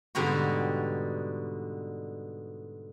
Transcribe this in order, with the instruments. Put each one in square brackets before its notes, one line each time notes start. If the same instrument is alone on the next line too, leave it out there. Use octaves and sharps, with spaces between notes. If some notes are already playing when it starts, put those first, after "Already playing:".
[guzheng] G#2 B2 D3 G3 F#4